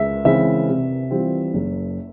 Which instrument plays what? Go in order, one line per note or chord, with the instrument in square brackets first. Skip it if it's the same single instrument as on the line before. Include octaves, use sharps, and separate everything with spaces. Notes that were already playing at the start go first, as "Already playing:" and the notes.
Already playing: [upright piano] C#2 [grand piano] E5
[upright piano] C#3 E3 G#3 C4 [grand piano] E5
[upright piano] C3
E3 G3 C4 F4
F#1